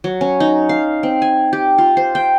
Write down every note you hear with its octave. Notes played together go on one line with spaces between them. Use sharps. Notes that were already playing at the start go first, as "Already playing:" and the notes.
F#3
C#4
D#4
F5
C4
G#5
G4
F4
C5
G5